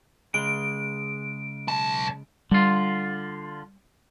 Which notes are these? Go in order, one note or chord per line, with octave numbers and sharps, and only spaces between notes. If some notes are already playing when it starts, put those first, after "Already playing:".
C#3 G#3 D7
B1 A5
D3 G3 F4